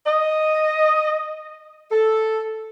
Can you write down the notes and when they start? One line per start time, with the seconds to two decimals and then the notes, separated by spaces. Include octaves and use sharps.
0.07 D#5
1.92 A4